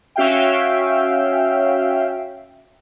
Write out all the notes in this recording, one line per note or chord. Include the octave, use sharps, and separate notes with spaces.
C#4 F#4 E5 F5 G5